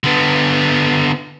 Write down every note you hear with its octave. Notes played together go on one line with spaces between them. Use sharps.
D3 B3